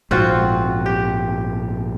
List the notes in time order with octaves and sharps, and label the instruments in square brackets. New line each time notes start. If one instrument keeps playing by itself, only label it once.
[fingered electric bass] A#1 G#2 [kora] C4 F4 F#4
[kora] G4